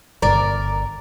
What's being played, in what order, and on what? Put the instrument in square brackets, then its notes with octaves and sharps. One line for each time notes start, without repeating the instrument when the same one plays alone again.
[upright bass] G1 D3 [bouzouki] A#4 D5